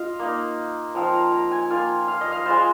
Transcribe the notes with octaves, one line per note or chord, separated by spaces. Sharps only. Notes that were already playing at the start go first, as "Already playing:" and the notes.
Already playing: F4 D#5 F5
A#3 D#4
F3 C4 F4 A#5
A#5
A#5
G#5
A#3 F4 G#5
F5
D#5
F5
G#3 F4 C5